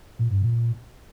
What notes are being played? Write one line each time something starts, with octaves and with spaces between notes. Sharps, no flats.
A#2
G2
A#2